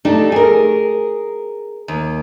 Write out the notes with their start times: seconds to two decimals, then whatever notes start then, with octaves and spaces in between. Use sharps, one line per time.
0.05 A3 D4 D#4 G4
0.32 G#4 A#4
1.88 D#2